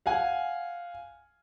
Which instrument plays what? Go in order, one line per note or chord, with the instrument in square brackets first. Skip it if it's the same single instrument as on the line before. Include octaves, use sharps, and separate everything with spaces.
[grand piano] F5 F#5 G#5